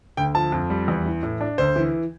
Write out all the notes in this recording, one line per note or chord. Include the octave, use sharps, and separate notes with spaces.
D2 G5
F3 A5
F2
G3
E2
E3
A2
D4
D2 C5
E3